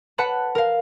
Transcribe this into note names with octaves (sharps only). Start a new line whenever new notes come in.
B4 F#5 A5 B5
A#4 F5